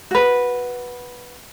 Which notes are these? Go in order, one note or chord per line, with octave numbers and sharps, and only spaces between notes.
F#4 B4